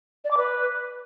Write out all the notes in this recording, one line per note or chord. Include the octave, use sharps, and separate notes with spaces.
D5
D6
B4